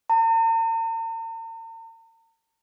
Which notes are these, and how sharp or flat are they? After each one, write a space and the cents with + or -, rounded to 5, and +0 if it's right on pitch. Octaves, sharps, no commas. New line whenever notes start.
A#5 -45